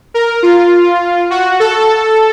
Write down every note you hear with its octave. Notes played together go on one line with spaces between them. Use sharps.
A#4
F4
F#4
A4